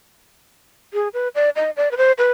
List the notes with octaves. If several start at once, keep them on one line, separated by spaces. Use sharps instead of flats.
G#4
B4
D5
D#5
D5
B4
C5
B4